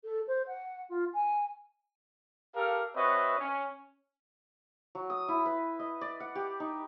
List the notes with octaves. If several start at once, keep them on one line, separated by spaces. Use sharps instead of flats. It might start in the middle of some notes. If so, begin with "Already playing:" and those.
A4
C5
F#5
F4
G#5
G4 A4 A#4 F5
C4 F#4 B4 C#5 D#5 E5
C#4
F#3
D#6
E4
B4
D#5
D5
F#5
G4
D#4